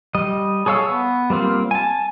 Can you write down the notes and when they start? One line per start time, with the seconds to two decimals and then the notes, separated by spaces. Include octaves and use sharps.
0.15 G3 D#5
0.66 G#4 A4 C#5 F5 E6
0.88 B3
1.30 G3 A#3 C4 F4
1.71 G#5 A5